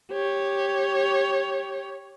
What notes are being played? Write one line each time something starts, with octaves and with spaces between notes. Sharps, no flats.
G4 C#5